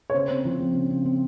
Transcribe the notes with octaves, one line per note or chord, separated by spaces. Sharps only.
C#5
C#3 C5
C4
F3
C4
C#3
C#3
C4